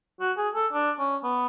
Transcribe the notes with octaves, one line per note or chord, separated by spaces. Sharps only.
F#4
G#4
A4
D4
C#4
B3